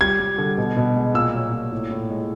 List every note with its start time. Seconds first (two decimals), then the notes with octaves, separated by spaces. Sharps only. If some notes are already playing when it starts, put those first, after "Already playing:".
0.01 G3 G#6
0.20 G3
0.38 D3
0.58 B2
0.77 B2
0.96 G#3
1.14 A#2 E6
1.34 F#3
1.52 A#2
1.72 A2
1.91 A2
2.10 G#3